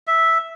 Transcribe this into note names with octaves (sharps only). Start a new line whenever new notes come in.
E5